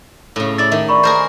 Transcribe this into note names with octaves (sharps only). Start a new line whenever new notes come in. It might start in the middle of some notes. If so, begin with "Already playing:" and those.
A2 C#3
E4 D5 A6
D#3 E5
D5 B5 C#6
G#4 A#4 C5